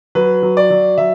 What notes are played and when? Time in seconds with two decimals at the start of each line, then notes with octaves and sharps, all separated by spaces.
0.15 F#3 B4
0.43 F#3
0.57 D5
0.70 F#3
0.98 F#3 E5